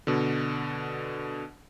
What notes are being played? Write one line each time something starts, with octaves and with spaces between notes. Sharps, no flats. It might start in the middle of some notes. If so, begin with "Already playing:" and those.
B2 D3